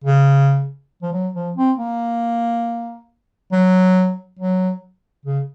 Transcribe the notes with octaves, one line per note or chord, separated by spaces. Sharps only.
C#3
F3
F#3
F3
C4
A#3
F#3
F#3
C#3